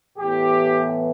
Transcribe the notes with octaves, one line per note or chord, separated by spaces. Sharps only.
A2 E3 B3 G4